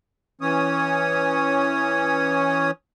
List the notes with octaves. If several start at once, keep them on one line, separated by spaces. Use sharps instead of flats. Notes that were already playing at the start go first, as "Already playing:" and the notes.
E3 C#4 C#5 D#6